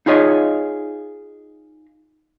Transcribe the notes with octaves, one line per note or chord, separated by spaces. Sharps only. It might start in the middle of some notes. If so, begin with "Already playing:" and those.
D#4 F4 G#4 C#5 D#5